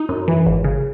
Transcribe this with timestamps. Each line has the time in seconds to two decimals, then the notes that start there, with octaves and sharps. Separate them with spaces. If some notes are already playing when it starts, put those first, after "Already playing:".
Already playing: D#4
0.09 F#2
0.28 E3
0.47 G#1
0.64 C#3